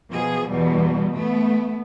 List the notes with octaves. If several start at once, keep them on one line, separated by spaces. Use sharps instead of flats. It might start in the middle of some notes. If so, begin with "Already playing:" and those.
B2 F3 G#4
E2 B2 G3
A3 B3